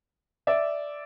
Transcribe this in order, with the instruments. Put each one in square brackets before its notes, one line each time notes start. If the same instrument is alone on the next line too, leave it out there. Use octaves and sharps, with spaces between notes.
[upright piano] D5 E5